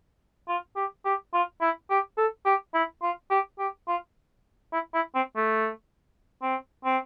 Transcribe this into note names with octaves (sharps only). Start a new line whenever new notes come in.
F4
G4
G4
F4
E4
G4
A4
G4
E4
F4
G4
G4
F4
E4
E4
C4
A3
C4
C4